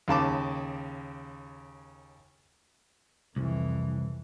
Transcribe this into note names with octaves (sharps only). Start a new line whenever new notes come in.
D#2 C#3 A5 D6
C2 F2 E3